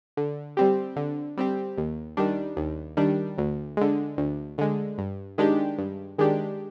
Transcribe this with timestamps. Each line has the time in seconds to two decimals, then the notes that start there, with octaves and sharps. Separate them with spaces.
0.17 D3
0.57 G3 C4 G4
0.96 D3
1.37 G3 C4 G4
1.78 D#2
2.17 D#3 G3 D4
2.57 D#2
2.97 D#3 G3 D4
3.38 D2
3.77 D3 G#3
4.18 D2
4.58 D3 G#3
4.98 G2
5.38 D#3 G#3 D4 G4
5.78 G2
6.18 D#3 G#3 D4 G4